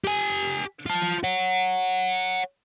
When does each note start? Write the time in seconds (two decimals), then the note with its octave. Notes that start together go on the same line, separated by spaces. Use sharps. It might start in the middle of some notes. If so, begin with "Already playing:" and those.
0.05 G4 G#5
0.86 F4 A5
1.24 C#5 F#5